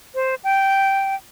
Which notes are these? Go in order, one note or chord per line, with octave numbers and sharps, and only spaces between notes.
C5
G5